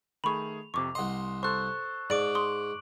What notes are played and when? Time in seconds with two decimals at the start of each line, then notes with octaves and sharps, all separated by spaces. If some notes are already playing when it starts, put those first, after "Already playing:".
0.24 D#3 A3 G#4 B5 C#6 F7
0.74 F2 C3 C#6 D6
0.95 C2 D#5 F#5 C6
1.43 A4 C5 C6 C#6 F#6
2.10 G#2 D5 D6 D7 F#7
2.35 C6 D#6